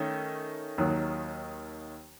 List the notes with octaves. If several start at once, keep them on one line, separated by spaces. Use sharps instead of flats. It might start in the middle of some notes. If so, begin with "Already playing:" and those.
Already playing: D#3 A3 C#4
D#2 D#3 F#3